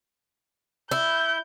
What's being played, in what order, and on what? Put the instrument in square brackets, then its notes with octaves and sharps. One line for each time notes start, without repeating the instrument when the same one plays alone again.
[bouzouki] E4 [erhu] G6